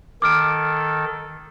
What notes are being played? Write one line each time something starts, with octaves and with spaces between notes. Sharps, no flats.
D#3 A4 D6 F6 D7